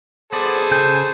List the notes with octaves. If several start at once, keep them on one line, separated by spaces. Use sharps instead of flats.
B3 G#4 A4 C5 D5
C#3 G#5 G6